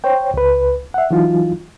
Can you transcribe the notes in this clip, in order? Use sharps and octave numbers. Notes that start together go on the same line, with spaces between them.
C5 C#5 G5
C#2 B4
E5 F#5
E3 F#3 D#4 F4